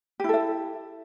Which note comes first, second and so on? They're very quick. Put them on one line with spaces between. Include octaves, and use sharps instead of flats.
G4 E4 A4 E5